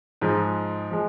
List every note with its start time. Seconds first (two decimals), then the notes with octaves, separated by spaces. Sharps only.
0.21 G#2 F3 G#3
0.91 F3 G#3